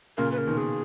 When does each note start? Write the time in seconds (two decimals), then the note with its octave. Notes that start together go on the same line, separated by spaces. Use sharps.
0.17 A#2 C#3 A#4
0.32 B4
0.38 C#3 A#4
0.47 B2 D#3
0.57 G#4